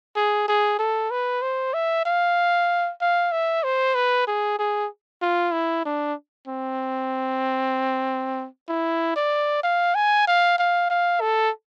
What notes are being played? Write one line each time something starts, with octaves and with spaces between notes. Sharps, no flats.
G#4
G#4
A4
B4
C5
E5
F5
F5
E5
C5
B4
G#4
G#4
F4
E4
D4
C4
E4
D5
F5
G#5
F5
F5
F5
A4